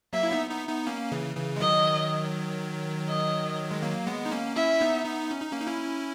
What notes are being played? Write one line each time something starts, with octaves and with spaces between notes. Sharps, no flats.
F#3 A#3 E5
E4
B3 D#4
B3 D#4
B3 D#4
A#3 C#4
C#3 E3
C#3 E3
G#3
D#3 F#3 D#5
D#5
G#3
F#3 A#3
G#3 B3
D#4
A#3 C#4
C#4 E4 E5
B3 D#4
B3 D#4
C#4
D#4
A#3 C#4
D#4
C#4 E4